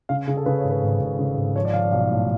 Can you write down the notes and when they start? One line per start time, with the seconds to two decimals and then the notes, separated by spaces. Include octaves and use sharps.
0.09 C#3 F5
0.27 C#3 G#4
0.37 A4
0.46 C#3 B4
0.58 C#5
0.64 G#1
0.70 B4
0.83 G#1
1.01 G#1
1.19 C#3
1.37 G#1
1.56 F3 C#5
1.65 D5
1.73 F3 F5
1.83 D5
1.92 B1 F5
2.10 A2